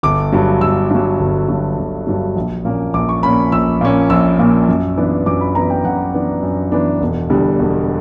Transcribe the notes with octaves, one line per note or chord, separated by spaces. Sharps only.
G1 D6
G2 F#3
G1 E6
G2 F#3
G1
G2 F#3
G1
G2 F#3
A#1
A#2 A#3 C#4
A#1 D6
C#6
A#2 A#3 C#4 B5
A#1 E6
A#2 A#3 C#4
A#1 E6
A#2 A#3 C#4
F#2
E3 B3 D4
F#2 D6
B5
E3 B3 D4 A#5
G5
F#2 F#5
E3 B3 D4
F#2
E3 B3 D4
E1
E2 D3 G3
E1